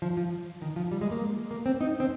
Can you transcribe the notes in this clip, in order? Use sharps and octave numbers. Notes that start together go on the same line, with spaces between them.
F3
F3
D#3
F3
G3
G#3
A#3
A#3
C4
D#4
C4